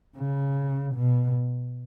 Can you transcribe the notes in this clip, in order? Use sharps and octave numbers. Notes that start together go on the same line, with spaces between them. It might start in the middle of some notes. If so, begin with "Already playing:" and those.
C#3
B2